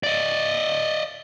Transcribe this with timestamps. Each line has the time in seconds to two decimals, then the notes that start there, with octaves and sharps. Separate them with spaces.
0.03 D5 D#5